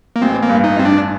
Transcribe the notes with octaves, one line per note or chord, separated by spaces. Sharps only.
A#3
A1 C4
A#3
G2
D#4
G2 C4
D4